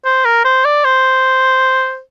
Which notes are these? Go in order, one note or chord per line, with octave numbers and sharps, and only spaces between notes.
C5
A#4
C5
D5
C5